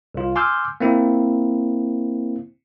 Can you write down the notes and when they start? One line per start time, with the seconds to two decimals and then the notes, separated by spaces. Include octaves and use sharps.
0.14 C2 F4
0.36 G#5 C6 D6 E6 F6 G6
0.80 A#3 C4 E4